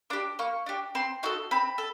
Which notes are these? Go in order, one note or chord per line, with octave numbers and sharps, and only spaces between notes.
D4 G4 D6
A#3 C#6
D4 G4
C4 C6
D#4 F#4 A4
C4 B5
A4